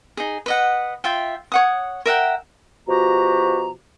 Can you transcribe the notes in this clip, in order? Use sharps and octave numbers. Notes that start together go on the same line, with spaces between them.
D#4 G#4
B4 D#5 F#5
F4 E5 G5
C#5 F#5 D#6
A#4 E5 F#5 G5
B2 F3 F#4 G4 A#5